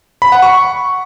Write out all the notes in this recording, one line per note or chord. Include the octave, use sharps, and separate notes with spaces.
B5
F#5
C#6